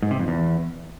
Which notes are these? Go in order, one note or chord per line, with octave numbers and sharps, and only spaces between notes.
G#2
C3
F2
E2